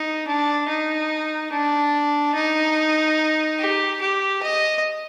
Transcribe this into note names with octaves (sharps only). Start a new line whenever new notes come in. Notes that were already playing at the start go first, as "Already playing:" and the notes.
Already playing: D#4
D4
D#4
D4
D#4
G4
G4
D#5